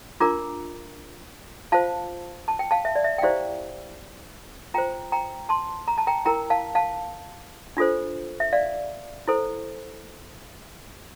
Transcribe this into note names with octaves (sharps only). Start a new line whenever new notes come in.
D4 F4 A#4 A#5 D6
F4 C5 F5 A5
A5
G5
F5 A5
E5
D5
E5
G5
E4 G4 C5 D5 F5
F4 C5 G5 A#5
G5 A#5
A5 C6
A#5
A5
G5 A#5
E4 A#4 G5 A#5
F5 A5
F5 A5
D4 F4 A4 C5
E5
D5 F5
E4 A4 C5